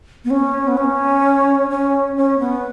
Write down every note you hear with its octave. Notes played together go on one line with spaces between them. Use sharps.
B3
C#4
B3
C#4
C#4
C#4
B3